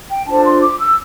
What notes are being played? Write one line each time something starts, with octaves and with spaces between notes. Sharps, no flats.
G5
D4 F4 A4 C5 A5
C6
D6
E6